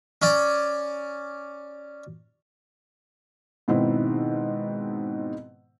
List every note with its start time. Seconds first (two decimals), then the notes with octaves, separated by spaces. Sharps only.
0.22 C#4 D5
3.68 G#2 B2 D#3 C4 E4